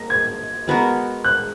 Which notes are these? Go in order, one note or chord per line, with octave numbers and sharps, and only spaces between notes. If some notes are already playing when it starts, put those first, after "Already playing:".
Already playing: A#3 A#6
G#6
G#3 B3 F#4 A#4
F#6